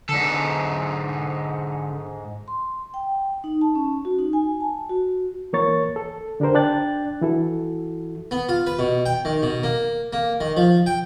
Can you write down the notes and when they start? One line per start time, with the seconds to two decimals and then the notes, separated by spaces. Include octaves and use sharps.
0.09 G#2 D3 A4
2.48 C6
2.94 G5
3.44 D#4
3.61 A5
3.75 C#4
4.05 F#4
4.19 D#4
4.33 G#5
4.61 A5
4.90 F#4
5.53 E3 A#3 A#4 C#5 C#6 A6
5.96 A4
6.40 D3 D4 G4 A#4 C5
6.55 D4 G5 F#6 A6
7.22 E3 E4 F#4 A4
8.31 B3
8.49 F4
8.67 B4
8.79 B2
9.06 G5
9.25 D#3
9.43 B2
9.63 A#3
10.13 A#3
10.41 D#3
10.57 F3
10.86 G5